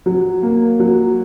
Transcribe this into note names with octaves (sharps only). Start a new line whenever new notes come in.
F#3
A#3
F#3